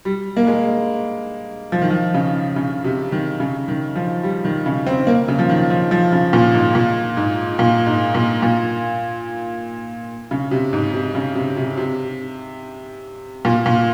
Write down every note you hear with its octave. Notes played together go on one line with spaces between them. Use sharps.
G3
A#3
G#3
F3
D#3
F3
C#3
C#3
C3
D#3
C#3
D#3
F3
G3
D#3
C#3
C4
A#3
C#3
F3
D#3
F3
F3
C#3
A#2
G#2
A#2
G#2
A#2
G#2
A#2
A#2
C#3
C3
G#2
C3
C#3
C3
C3
C3
A#2
A#2